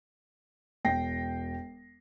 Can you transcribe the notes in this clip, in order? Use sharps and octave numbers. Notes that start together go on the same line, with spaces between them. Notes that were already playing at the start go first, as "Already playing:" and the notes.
E1 G5 A#6 C7